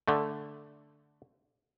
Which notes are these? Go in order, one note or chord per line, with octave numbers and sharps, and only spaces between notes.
D3 A3